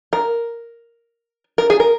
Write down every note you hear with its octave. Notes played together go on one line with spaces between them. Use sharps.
A#4
A#4
G#4
A#4